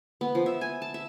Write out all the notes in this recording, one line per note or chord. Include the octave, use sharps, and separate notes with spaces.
B3
F3
E5
G#5
A5
E5